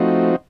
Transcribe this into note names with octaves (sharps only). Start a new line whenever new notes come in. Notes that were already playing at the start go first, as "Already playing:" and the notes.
Already playing: F3 A3 C4 D#4 F#4